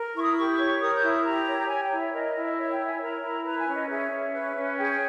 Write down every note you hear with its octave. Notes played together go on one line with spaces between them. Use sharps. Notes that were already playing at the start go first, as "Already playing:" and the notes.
Already playing: A#4
E4 C#6
D#6
G4 C#6
C#5
A#4 D#6
G6
E4
D#6
G4 A#5
C#5
C#5 G#5
G5
E4
E5
A#4 D#5
E4
D#5
C#5 E5
G5
E4
G#5
A#4 A#5
E4
B4 A#5
G#5
C#4
D#5
G#4 E5
C#4
B4
C#4
G#4 G5